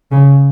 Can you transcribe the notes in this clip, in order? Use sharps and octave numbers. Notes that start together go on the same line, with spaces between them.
C#3